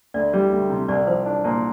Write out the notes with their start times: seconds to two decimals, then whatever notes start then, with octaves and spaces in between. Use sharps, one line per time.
0.14 D2 D5
0.33 G3
0.52 D2
0.70 C3
0.88 C2 D5
1.07 F3 C5
1.26 D4
1.44 A#2